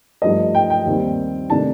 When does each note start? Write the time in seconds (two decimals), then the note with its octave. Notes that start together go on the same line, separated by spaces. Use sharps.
0.22 G2 F3 A3 D#4 D#5
0.55 G5
0.70 G5
0.85 D#2 D#3 G3 C4
1.50 C3 D#3 A3 D4 A5